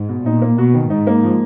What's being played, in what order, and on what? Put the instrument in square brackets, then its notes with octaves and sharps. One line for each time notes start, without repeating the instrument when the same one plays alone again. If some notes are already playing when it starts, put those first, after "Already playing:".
Already playing: [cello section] G#2
[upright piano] B2
[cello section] A#2 [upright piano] D#4
[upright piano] A#3
[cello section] B2 [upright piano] F#4
[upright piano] D#3
[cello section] G#2 [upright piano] D#4
[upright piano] A#3
F3